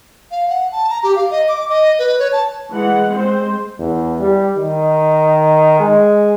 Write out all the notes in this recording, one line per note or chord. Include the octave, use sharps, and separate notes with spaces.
F5
F#5
A5
A#5
G4
F5
D#5
D6
D#5
B4
C#5
A5
E3 G#3 F#5
G#3 C4 C5
E2
G3
D#3
G#3